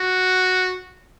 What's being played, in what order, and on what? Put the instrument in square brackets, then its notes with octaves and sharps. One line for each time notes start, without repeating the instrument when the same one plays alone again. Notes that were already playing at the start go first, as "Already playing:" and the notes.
Already playing: [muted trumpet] F#4